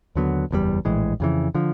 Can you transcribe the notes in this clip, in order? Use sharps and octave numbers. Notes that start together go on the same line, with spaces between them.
D#2 D3 F#3 B3
F#1 E2 B2 G3
A#1 A2 E3 G#3
F2 C#3 E3
D3 F3